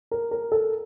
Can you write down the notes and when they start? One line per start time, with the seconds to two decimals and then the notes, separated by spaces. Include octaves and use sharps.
0.11 A#4
0.31 A#4
0.52 A4